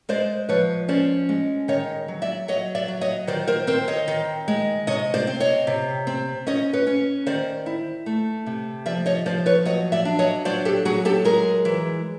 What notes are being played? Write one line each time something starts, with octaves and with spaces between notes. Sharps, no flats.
G#3 C5 D5
F3 B4 C#5
C#4 C5 D5
G#3
D#3 C#5 D#5
F#3
D5 E5
F#3 C#5 D#5
D5 E5
F#3
C#5 D#5
D#3 C5 D5
A#4 C5
C4 A#4 C5
C#5 D#5
D#3
G#3
C3 C#5 D#5
C5 D5
C4
C#5 D#5
C3
C4
C#4 C#5 D#5
B4 C#5
C#4
D#3 C5 D5
E4
A3
C3
F3 D5 E5
C#5 D#5
F3 C5 D5
B4 C#5
F#3 C#5 D#5
D5 E5
D4
C#5 D#5
F#3 C5 D5
G4 A4
F#3 F#4 G#4
G4 A4
G#3 G#4 A#4
E3